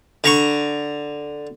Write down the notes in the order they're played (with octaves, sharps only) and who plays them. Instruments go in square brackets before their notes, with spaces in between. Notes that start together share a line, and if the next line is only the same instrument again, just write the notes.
[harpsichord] D3 A#5 C#6